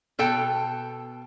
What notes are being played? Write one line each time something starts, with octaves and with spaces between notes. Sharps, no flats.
B2 A4 G5 A5